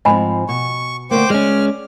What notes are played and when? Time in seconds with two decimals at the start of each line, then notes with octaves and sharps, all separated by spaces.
0.05 G#2 F3 C4 D#5 G#5 B5
0.49 B2 C#6
1.11 D3 A3 A#3 C5 G5 D6
1.30 G#3 C#4 D5 F6